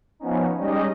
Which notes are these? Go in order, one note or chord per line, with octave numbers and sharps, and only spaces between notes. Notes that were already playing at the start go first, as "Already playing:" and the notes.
F3 B3 C#4 D#4
G3 G#3 C#4 D#4 G4 D#5